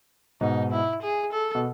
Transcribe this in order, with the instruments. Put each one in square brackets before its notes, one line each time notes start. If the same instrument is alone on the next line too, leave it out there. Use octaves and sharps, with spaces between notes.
[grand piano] G#2 B2 [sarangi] D#4
[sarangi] E4
G#4
A4
[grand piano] B2